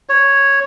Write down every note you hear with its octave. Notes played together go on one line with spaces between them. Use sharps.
C#5